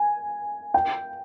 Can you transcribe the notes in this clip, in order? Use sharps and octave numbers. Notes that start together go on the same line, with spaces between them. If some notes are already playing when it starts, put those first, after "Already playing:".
Already playing: G#5
G5